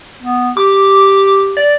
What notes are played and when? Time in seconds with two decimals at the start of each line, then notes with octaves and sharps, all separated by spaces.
0.22 B3
0.57 G4 D6
1.57 D5